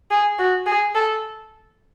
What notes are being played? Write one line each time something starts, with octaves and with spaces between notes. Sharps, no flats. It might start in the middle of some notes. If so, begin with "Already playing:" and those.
G#4
F#4
G#4
A4